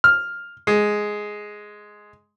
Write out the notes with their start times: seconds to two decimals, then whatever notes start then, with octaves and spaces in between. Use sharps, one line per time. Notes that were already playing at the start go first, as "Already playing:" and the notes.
0.04 F6
0.67 G#3